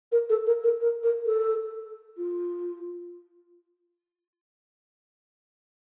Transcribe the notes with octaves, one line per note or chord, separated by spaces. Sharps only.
A#4
A4
A#4
A#4
A#4
A#4
A4
F4